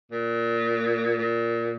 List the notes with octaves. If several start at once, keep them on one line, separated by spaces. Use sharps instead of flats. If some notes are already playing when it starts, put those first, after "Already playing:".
A#2
A#2